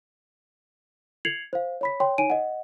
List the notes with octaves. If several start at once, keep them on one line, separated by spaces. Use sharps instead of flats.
G#6 C7 C#7 F7 F#7
C5 F5
C#5 B5 B6
C#5 G5 C6
D#4 C#5 G#5 D7 D#7
D#5 F#5